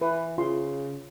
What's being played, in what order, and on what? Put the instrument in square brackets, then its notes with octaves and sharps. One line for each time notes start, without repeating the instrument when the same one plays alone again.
[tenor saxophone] E3 [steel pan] B4
[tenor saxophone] C#3 [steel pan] F4 C6